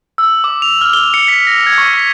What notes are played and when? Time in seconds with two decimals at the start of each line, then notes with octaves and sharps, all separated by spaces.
0.18 E6
0.44 D6
0.62 F7
0.81 F6
0.93 G7
1.14 C#7
1.28 B6
1.47 A#6
1.67 G#6
1.78 C#6
1.93 B6